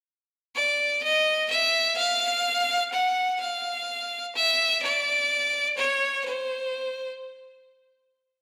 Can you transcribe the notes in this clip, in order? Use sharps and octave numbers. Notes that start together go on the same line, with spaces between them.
D5
D#5
E5
F5
F#5
F5
E5
D5
C#5
C5